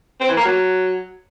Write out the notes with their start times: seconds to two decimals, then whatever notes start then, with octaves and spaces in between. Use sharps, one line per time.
0.20 C4
0.29 E3
0.37 A#3
0.45 F#3